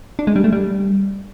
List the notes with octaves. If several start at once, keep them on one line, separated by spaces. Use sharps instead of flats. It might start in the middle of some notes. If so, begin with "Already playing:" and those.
D4
G#3
G3
A3
G3